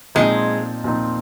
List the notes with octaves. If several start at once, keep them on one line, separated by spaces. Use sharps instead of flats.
A#2 F3 G#3 C4 D#4
A#2 F3 C4 D#4